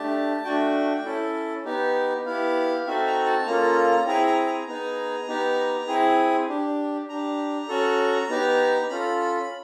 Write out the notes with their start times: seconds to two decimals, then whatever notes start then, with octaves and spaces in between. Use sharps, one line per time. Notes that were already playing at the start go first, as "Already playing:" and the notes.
Already playing: A3 D4 G4 A5
0.45 A3 D4 F#4 G5
1.05 C#4 E4 A4
1.65 B3 D#4 G4
2.25 B3 E4 G4 F5
2.87 C4 D#4 F#4 A4 E5
3.06 A#5
3.26 A5
3.46 A#3 C#4 F4 A4 A#5
4.06 C4 E4 G#4 A#5
4.27 A#5
4.47 A#5
4.68 B3 D#4 G#4 A#5
5.28 B3 D#4 G4
5.88 C4 E4 G#4
6.49 D4 G4
7.09 D4 G4 A#5
7.69 C#4 F#4 A4
8.29 B3 D#4 G4
8.90 C#4 F4 A4 B5